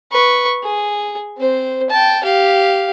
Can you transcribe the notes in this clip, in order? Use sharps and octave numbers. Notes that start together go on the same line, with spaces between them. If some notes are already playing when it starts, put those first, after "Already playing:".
B4 C#6
G#4
C4 C5
G5 A5
G4 F5